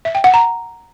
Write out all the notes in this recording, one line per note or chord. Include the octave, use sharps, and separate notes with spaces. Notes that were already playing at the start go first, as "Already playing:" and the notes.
E5
G5
F#5
A#5